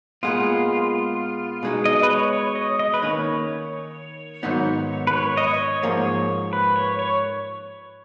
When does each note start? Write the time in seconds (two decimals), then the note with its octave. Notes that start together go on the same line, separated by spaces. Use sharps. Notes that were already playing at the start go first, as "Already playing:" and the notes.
0.23 A#2 G#3 B3 F4
1.63 B2 G#3 D#4
1.85 D#5
2.03 B4
2.10 C#5
2.33 C#5
2.55 D#5
2.79 D#5
2.94 B4
3.02 D#3 A#3 C#4 C#5
4.43 G#2 D#3 F#3 B3 D#4
5.07 B4
5.13 C#5
5.37 D#5
5.48 C#5
5.82 G#2 F3 A#3 C#5
6.53 B4
6.76 C#5
6.99 C#5